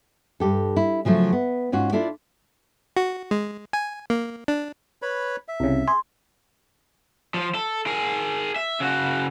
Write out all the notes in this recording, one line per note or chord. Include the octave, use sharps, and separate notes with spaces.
G2 G4 A4
E4
C#3 F3 F#3 A3
B3
G#2 C#4 F4 F#4
D4 E4 F4 A4 D5
F#4
G#3
G#5
A#3
D4
B4 C#5 B5
E5
C2 C#3
G#4 C6
F3
A4
G#4 A#4
E5
C#3 F#4